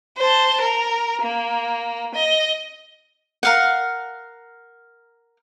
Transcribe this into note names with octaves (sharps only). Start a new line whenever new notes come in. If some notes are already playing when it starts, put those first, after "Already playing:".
C5 A5
A#4
A#3
D#5
A#4 F5 F#5